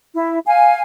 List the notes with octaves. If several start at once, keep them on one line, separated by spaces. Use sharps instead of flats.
E4
F5 G#5